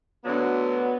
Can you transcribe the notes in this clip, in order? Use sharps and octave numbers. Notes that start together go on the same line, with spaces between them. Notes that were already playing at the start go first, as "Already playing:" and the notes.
D2 D3 F#3 B3